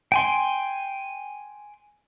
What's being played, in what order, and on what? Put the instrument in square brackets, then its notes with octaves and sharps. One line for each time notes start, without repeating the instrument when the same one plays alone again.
[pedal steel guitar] G5 G#5 C6